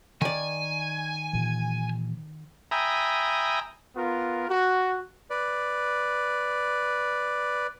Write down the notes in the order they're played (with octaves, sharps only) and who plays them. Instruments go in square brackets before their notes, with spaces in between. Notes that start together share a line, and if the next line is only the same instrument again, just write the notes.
[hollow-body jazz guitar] D#3 D5 [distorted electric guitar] G#5
[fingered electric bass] A#2 E3
[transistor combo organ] E5 G5 G#5 A#5 B5 D#6
[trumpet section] B3 F4 A#4
F#4
[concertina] B4 D5